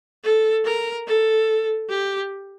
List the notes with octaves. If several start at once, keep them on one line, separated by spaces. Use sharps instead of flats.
A4
A#4
A4
G4